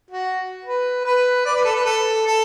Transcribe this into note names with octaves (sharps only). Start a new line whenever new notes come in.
F#4
B4
B4
D5
B4
A4
B4
A4
A4